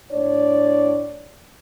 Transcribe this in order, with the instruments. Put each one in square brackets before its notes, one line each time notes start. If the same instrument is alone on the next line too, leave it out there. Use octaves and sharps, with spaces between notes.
[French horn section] A2 D4 C#5 D5